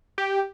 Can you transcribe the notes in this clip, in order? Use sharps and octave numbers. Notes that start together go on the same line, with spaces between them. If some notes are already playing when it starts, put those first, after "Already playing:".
G4